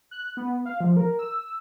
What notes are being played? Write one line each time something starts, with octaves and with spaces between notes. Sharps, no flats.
F#6
B3
F5
F3
A#4
E6